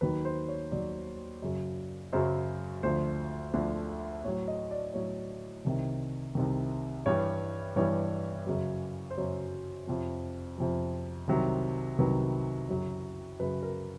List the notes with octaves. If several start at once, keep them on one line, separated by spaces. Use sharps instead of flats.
D#2 D#3 F#3 B4
C5
C#5
D#2 D#3 F#3 D5
F#2 C#3 F#3
F#2 C#3 F#3 C5
D2 D3 F3 C5
D2 D3 F3
A2 F#3 C#5
D#5
D5
A2 F#3 C#5
C2 C3 D#3
C2 C3 D#3
G2 E3 G3 C#5
G2 E3 G3 C#5
F#2 C#3 F#3
C5
F#2 C#3 F#3 C#5
F2 C3 F3
F2 C3 F3
C2 C3 D#3 F#3
C2 C3 D#3 F#3 B4
F#2 C#3 F#3
F#2 C#3 F#3 B4
A#4